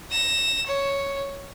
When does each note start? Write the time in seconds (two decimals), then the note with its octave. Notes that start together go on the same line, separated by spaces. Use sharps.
0.11 A#6 E7
0.66 C#5